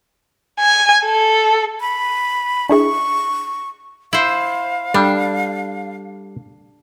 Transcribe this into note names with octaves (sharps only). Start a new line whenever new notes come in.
G#5
A4
B5
D4 E4 G#4 C#6
E4 C5 F5
G3 D4 A4